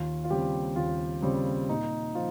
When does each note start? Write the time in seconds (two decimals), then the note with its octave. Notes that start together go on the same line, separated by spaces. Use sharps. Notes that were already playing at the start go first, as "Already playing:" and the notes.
Already playing: D#2 F4
0.24 F4
0.30 C#3 G3 C4 G4
0.76 D#2 F4
1.22 C#3 G3 C4
1.69 A#2 D#4
2.15 F3 F4